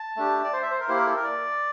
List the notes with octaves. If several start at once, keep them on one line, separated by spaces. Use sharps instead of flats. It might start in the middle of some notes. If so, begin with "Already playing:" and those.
Already playing: A5
A3 D4 G4
D5
C5
E5
C5
A#4
A#3 E4 G4 C5
A#4
A4
A#4
D5